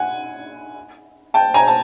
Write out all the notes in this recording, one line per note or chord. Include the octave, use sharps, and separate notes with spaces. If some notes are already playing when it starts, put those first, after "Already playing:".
Already playing: F#5 G#5
G5 A5
G#5 A#5
A5